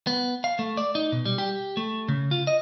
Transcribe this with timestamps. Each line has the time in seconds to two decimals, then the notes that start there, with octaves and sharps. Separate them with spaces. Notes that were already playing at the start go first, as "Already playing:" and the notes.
0.07 B3
0.44 F5
0.59 A3
0.77 D5
0.95 D#4
1.12 B2
1.26 G3
1.38 G4
1.77 A3
2.08 C#3
2.31 F4
2.47 D#5